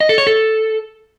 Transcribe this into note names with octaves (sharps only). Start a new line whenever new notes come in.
D#5
A4
C#5
A4